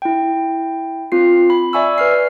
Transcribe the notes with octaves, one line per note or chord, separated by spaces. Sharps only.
E4 G5
C4 F4 C7
B5
D5 E5 G#5 C#6 E6
B4 F6 C7